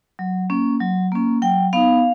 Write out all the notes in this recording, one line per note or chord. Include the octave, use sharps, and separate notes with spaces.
F#3
A#3 C#4
F#3
A#3 C#4
F#3 G5
B3 D#4 F5